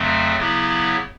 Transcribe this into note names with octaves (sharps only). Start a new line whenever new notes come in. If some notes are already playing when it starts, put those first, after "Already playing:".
Already playing: F2 C#3 F#3 A3 C4
C#3 F#3 B3 E4 G4